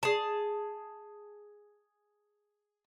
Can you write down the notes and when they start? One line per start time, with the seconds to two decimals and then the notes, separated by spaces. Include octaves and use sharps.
0.03 G#4 A5